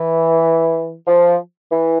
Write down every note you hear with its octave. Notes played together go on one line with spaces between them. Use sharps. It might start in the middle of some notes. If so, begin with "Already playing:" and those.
Already playing: E3
F3
E3